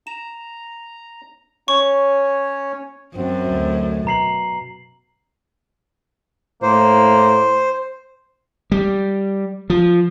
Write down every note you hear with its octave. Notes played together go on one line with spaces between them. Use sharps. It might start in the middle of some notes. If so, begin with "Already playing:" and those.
A#5 E7
C#4 C#5 C#6
F#2 F#3 C4
D2
B2 A#5 C7 F#7
A2 A#3 C5
G3
F3